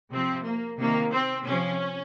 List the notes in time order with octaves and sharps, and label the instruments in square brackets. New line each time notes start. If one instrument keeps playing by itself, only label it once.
[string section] C3 F3 C4
A#3
C3 D#3 A#3
C4
C3 F3 C#4